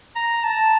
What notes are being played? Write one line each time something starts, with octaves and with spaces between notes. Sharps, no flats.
A#5
A5